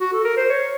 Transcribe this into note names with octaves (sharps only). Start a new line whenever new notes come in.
F#4
A4
A#4
C5
C#5